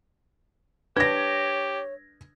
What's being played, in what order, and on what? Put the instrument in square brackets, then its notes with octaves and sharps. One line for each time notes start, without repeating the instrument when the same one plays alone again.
[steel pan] D4 B4 [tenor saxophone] G4 [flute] C#5 [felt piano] G#6 A#6